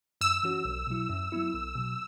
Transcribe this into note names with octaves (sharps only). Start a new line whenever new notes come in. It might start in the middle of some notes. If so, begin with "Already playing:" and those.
F#2 E6
E3 C#4 F#4 C#5
B1
B2 F#3 E4
F#2
F#3 B3 E4
B1
B2 F#3